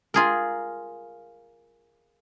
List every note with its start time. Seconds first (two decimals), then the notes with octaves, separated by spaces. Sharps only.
0.14 F4 G#4 A#4